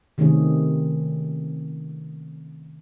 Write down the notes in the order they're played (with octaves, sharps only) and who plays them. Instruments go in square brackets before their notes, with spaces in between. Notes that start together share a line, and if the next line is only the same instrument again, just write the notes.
[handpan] C3 D#3 A3 C4 C#4 G#4